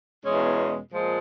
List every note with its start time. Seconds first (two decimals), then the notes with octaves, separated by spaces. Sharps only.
0.24 E2 B2 G#3 C#4
0.92 A#2 F3 G#3